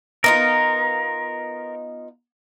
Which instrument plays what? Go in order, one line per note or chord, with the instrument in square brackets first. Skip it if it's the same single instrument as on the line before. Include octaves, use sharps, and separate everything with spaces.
[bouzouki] B3 D#4 F4 [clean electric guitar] A#4